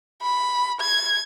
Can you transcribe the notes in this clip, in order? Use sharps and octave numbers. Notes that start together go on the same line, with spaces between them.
B5
G#6